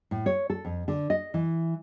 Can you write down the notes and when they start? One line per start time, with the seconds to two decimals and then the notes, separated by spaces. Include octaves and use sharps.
0.11 A2
0.26 C#5
0.50 A4
0.65 F2
0.88 D3
1.10 D#5
1.34 E3